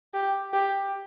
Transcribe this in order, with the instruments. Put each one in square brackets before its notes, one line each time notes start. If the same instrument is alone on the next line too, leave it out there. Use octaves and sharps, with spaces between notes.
[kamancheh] G4
G4